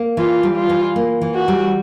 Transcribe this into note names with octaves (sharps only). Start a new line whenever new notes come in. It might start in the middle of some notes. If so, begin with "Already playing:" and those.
Already playing: A#3
E3 F4
G3
F4
E3
A#3
E3
F#4
G3